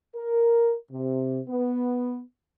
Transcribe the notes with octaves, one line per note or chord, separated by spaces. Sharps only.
A#4
C3
B3